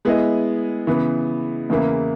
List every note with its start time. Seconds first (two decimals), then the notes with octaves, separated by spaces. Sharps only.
0.05 G#3 B3 E4 G#4 D#5
0.87 C#3 E3 B3
1.69 E2 C#3 E3 A#3 E4